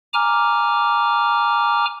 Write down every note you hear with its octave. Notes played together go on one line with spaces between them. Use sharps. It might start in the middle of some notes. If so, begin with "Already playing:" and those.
G#5 A#5 D6 F6